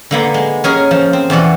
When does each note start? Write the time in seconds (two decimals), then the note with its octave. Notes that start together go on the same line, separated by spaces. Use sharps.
0.11 D3 A#3 B3
0.34 G#3
0.64 C#4 G#4 A#4
0.91 F3
1.13 C4
1.30 E2 B2 D5 F#5